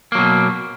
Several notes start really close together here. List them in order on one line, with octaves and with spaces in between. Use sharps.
A#3 F#3 B2